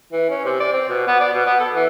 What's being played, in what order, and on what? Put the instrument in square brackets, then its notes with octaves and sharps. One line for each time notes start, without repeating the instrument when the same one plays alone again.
[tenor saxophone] E3
C#4
C3
D5
C4
B2
B3
D5
B2
B3
A4
E3